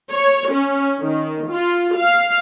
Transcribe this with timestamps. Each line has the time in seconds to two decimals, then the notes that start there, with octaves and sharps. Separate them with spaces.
0.12 C#5
0.51 C#4
1.02 D#3
1.49 F4
1.97 F5